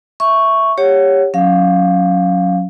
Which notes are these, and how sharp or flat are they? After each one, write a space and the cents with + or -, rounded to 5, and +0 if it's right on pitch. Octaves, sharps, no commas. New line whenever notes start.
E5 +0 C#6 +0
G4 +20 C#5 +0 F#5 +20
F#3 -20 C#4 +0 F5 +0